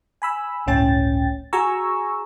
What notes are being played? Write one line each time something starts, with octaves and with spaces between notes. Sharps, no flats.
G#5 B5 E6
G1 C#2 A2 C#4 G5 A6
F#4 G#4 G#5 A#5 C#6 E6